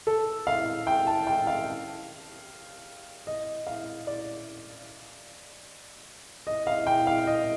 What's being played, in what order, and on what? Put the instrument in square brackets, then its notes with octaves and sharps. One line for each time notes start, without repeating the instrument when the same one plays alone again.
[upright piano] A4
F5
G5
A5
G5
F5
D#5
F5
D5
D#5
F5
G5
F5
D#5